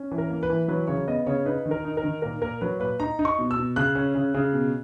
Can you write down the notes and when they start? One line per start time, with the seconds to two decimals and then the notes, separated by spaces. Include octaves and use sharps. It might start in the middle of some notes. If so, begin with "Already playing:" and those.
Already playing: C#4
0.11 E3
0.18 A#4
0.30 A#3
0.43 B4
0.50 E3
0.68 F#3 B4
0.87 C#3 C#5
1.07 B3 D#5
1.26 C#3 C#5
1.45 D#4 B4
1.66 D#3
1.71 A#4
1.85 D#4
1.97 A#4
2.03 D#3
2.22 A#2 A#4
2.42 A#2 A#4
2.61 F#3 B4
2.80 A#2 B4
3.00 D#4 A#5
3.19 D#4
3.25 C#6
3.39 B2
3.51 E6
3.57 B2
3.76 C#3 F#6
3.95 C#4
4.15 C#3
4.34 C#3
4.53 B2